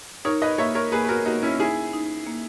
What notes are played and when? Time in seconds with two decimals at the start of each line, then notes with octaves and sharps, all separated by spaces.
0.25 D#4 A#4 C#5
0.42 B4 D#5
0.58 A#3 C#5 E5
0.75 A#4 C#5
0.92 A#3 G#4 B4
1.05 B4
1.09 F#4 A#4
1.26 A#3 D#4 F#4
1.43 C#4 E4
1.60 D#4 E4 G#4
1.93 D#4
2.27 A#3